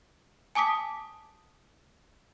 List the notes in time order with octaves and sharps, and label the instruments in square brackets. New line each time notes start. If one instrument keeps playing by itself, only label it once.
[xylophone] G#5 A5 D6 D#6 B6